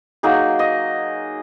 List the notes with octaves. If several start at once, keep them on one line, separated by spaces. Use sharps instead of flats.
F#3 A#3 D#4 G#4
D#5